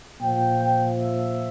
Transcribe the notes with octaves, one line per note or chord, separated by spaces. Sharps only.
A#2 F3 G5
E5